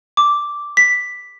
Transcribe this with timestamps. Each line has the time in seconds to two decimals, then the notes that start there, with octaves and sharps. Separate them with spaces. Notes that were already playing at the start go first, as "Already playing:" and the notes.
0.17 D6
0.77 B6